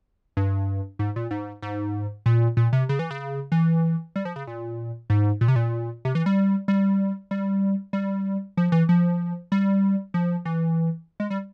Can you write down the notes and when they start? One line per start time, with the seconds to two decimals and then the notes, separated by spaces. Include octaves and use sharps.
0.37 G2
0.99 G#2
1.16 A#2
1.31 G#2
1.62 G#2
2.26 A#2
2.57 A#2
2.73 C3
2.89 C#3
2.99 E3
3.11 C#3
3.52 E3
4.16 G3
4.25 F3
4.36 C#3
4.47 A#2
5.10 G#2
5.41 A#2
5.48 C3
5.56 A#2
6.05 C3
6.15 E3
6.26 G3
6.68 G3
7.31 G3
7.93 G3
8.57 F3
8.72 E3
8.89 F3
9.52 G3
10.14 F3
10.45 E3
11.20 G#3
11.30 G3